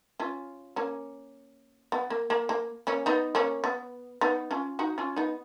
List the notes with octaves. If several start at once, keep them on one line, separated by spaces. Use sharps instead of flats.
C#4 F4
A#3 C#4
B3
A#3
A#3
A#3
A#3 C#4
B3 D#4
A#3 C#4
B3
B3 D#4
C#4 F4
D#4 F#4
C#4 F4
B3 D#4